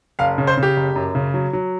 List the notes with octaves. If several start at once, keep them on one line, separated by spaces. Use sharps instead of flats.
F#1 F5
C#3
C5
C#3
G4
F#1
F#2
C#3
F#3
F#3